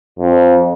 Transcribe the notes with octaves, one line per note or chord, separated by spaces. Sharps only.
F2